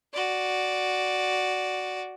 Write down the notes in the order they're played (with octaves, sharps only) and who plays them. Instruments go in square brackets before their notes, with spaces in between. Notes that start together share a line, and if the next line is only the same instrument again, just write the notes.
[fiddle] F#4 D5